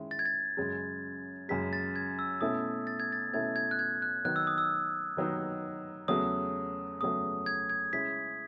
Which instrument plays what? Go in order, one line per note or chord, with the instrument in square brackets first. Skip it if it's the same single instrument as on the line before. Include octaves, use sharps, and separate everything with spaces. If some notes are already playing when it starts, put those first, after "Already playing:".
Already playing: [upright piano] D#3 G#3 C#4 E4
[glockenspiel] A6
G#6
A6
[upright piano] F#2 C#3 G#3
[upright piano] F#2 C#3 G#3 [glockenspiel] B6
[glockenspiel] A6
G#6
E6
[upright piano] B2 A3 C#4 E4 [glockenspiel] D#6
[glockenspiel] A6
G#6
A6
[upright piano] B2 A3 C#4 E4 [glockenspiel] G#6
[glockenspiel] G#6
F#6
G#6
F#6
[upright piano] D#3 F#3 B3 D#4 [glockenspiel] F#6
[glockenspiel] E6
D#6
E6
[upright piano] D#3 F#3 B3 D#4
[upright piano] E2 C#3 F#3 A3 [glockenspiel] D#6
[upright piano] E2 C#3 F#3 A3 [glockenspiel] D#6
[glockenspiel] G#6
G#6
[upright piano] C#3 G#3 C#4 E4 [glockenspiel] B6